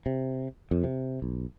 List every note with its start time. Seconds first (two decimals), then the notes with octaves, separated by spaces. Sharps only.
0.06 C3
0.71 F2
0.84 C3
1.22 B1